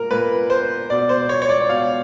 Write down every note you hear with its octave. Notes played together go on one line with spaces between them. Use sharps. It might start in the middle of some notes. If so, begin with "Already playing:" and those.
Already playing: A#2 A#4
A#2 B4
C5
B2 D5
C5
C#5
C#5
D5
B2 F5